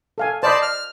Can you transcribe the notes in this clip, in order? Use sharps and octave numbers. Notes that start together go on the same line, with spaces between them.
A4 F5 G#5
C5 D5 D#5 A5 B5
F6